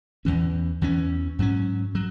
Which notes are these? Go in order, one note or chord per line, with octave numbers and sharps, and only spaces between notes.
E2 E3 C#4
E2 E3 C#4
G#2 F#3 C#4
F#3